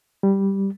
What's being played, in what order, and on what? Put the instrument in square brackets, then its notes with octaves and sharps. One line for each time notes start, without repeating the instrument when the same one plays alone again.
[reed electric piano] G3